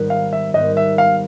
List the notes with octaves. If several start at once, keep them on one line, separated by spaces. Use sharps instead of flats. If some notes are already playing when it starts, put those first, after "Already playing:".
Already playing: G#2 D#3 G3 B3
F5
E5
G#2 D#3 G3 B3 D#5
E5
F5